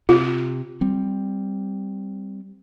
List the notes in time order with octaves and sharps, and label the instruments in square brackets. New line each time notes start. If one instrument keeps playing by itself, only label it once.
[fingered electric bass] C3 [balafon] F4
[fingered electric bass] G3 C4